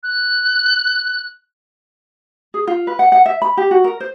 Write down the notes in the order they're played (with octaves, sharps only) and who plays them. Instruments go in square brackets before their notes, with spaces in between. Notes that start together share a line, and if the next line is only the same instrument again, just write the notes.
[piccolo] F#6
[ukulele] G#4
F4
B4
F#5
F#5
E5
B5
G4
F#4
A#4
C5